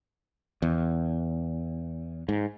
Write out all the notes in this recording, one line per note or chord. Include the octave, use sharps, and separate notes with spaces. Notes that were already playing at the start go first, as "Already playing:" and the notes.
E2
G#2